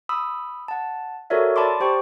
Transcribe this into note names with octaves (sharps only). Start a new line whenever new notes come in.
B5 D#6 E6
F#5 A5
F#4 A4 A#4 C#5 D5 E5
D5 A5 B5 C6 D6
G4 C5 G5 C#6